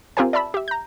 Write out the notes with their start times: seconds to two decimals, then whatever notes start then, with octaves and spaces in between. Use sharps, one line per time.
0.17 C4 F4 G4 A#4 C5 G#5
0.33 D5 E5 A5 B5 E6
0.54 G4 E5
0.68 A#5 G6